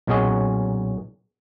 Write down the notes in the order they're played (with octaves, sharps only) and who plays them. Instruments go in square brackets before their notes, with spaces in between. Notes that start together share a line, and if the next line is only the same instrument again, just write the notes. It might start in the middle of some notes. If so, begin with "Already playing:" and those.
[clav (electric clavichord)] B1 A#2 C#4 F#4 G#4 D#5